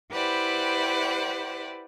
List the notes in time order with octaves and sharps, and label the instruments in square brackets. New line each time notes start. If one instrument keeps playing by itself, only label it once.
[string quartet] E4 G4 B4 C5 D5 F#5